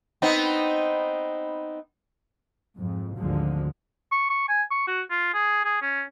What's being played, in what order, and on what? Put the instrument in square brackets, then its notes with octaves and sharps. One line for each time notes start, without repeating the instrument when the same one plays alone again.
[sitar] B3 C4 D#4
[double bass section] F2 G#2
G#1 D2 D3 F3 G#3
[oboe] C#6
C#6
G#5
C#6
F#4
F4
G#4
G#4
C#4